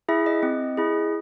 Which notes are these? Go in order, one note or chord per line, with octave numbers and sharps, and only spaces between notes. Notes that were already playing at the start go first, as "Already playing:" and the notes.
E4 G#4 E5
D#5
C4
E4 G#4